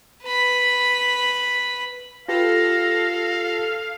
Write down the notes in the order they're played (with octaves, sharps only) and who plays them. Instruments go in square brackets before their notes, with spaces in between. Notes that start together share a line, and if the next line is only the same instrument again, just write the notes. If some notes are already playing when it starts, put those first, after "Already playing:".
[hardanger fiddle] B4 B5
[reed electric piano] F4 G4 B4 [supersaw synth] A4 [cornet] F5 [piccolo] A#6